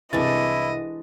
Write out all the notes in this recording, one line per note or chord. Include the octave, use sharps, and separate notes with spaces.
C2 E3 G#3 D4 E4 D#5 A6